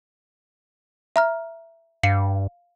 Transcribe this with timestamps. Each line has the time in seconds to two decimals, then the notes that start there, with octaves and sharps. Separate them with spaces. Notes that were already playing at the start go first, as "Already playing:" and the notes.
1.16 E5 A#5 F6
2.03 G2 F5 C7 C#7